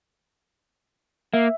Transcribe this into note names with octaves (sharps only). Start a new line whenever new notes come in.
A#3 E5